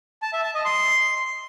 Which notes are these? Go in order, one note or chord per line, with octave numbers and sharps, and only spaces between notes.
A5
E5
A5
D#5
C6